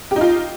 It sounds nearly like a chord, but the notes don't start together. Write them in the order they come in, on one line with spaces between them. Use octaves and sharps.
G4 D#4 F4